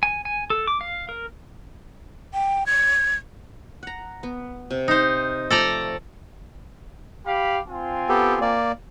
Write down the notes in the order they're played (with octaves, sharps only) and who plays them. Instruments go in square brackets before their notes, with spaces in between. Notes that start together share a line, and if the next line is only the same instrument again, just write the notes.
[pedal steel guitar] G#5
G#5
A4
D6
F5
A#4
[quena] G5
G#6
[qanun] F#5 A#5
B3
C3
[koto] D#4 C5
[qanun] F3 A3 [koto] A4 D5 A#5
[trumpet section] G4 F5 B5
C4 F4 G#5
[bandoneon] B3 G4 A4
A#3 D5